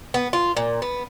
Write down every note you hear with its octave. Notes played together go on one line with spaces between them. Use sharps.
B3
F4
A#2
B3